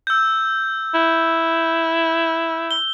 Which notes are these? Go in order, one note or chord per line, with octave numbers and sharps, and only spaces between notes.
E6 G6
E4
G7